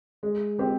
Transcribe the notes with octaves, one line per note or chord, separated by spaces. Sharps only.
G#3
C4 G4 C5